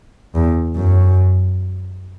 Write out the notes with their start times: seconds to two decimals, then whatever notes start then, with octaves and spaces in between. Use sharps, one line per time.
0.35 E2
0.77 F#2